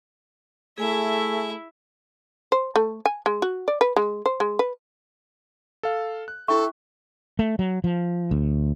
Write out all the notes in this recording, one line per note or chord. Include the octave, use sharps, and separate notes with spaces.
A3 E4 G#4 E5 G#5
C5
A3
G#5
G#3
F#4
D5
B4
G#3
C5
G#3
B4
A4 F5
F#6
E4 A4 E5 G5 C#6
A3
F#3
F3
D2